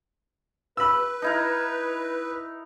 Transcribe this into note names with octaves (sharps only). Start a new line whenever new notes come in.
B4 B5 E6
D#4 E4 A#4